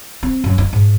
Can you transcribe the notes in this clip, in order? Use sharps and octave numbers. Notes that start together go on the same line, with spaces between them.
C4
F#2
D#4
G#2